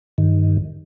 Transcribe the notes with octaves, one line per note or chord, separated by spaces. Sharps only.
G2 D#3